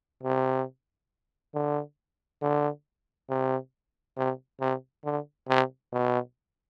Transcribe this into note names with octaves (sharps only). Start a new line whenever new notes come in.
C3
D3
D3
C3
C3
C3
D3
C3
B2